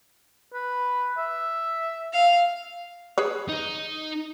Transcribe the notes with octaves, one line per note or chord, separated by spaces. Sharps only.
B4
E5
F5
G#4 B4 C#5
D#4